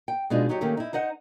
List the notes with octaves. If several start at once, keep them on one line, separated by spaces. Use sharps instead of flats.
G5
B2 G#3 D4 D#4 F4
F#3 D#4 G4 C#5
D#3 A3 A#3 C#4 G4
D#4 E4
D#4 C5 D#5 F#5